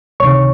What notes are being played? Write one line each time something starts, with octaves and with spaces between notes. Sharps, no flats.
C#2 C3 D#3 C#5 C#6